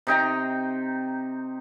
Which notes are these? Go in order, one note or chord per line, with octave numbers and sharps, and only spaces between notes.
C3 D#4 G5 A#5